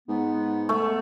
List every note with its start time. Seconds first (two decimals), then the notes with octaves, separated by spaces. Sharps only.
0.09 G#2 B3
0.69 A3